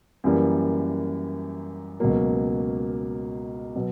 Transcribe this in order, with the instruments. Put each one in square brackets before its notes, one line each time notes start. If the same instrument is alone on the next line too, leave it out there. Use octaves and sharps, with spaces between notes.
[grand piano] F#2 E3 G3 A#3
C#2 B2 F#3 A#3
B2 F#3 B3